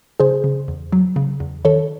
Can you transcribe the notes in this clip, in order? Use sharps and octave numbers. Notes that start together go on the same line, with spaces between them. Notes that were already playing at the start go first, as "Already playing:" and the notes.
C#3 G#4 C5
C#3
E2
F#3
C#3
E2
D#3 A4 C#5